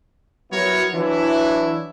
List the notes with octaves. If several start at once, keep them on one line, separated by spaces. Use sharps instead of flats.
F#3 B3 E4 F#4 A#4 C#5
E3 F#3 D4 E4